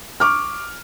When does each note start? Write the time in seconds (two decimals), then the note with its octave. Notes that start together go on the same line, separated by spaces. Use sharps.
0.20 C#6 D6 F6